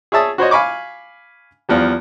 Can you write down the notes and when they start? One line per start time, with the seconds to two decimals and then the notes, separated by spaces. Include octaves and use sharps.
0.12 G#4 C#5 E5 A5 D#6
0.38 F#4 C5 C#5 D#5
0.51 F5 G#5 B5 C#6 D6
1.69 E2 F3 G3